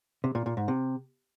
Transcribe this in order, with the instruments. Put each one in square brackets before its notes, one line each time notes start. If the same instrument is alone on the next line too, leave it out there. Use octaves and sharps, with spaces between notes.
[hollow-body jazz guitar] C3
A#2
A#2
G#2
C3